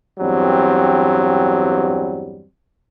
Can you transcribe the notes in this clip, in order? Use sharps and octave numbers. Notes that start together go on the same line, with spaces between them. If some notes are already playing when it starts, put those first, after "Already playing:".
E2 G2 F#3 G3 C4